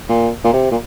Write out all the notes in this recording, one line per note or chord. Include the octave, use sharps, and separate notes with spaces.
A#2
A#2
C3
A#2